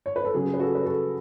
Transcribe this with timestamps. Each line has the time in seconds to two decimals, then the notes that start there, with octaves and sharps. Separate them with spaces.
0.06 C#5
0.16 B4
0.25 A4
0.34 C#3 F#3 G#4
0.54 B4
0.60 F#4 A4
0.75 B4
0.86 F#4 A4